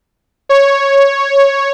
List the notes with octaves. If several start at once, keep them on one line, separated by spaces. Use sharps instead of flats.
C#5